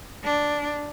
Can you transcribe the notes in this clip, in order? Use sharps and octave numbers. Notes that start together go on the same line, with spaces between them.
D4